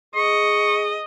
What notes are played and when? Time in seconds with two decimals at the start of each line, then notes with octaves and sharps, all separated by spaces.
0.15 G#4 D#5 C#6